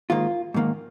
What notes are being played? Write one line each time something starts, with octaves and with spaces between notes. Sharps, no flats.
G#2 D#3 A#3 F4
G#2 D#3 A#3